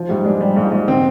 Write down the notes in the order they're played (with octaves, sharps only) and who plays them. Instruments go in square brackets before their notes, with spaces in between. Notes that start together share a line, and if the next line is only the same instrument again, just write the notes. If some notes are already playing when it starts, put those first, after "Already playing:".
Already playing: [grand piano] F3
[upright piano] G#2 [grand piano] G3
[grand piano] G#3 [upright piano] D4
[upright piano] G3
G#2
[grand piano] F3
[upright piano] G#2
[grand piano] D3 [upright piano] C4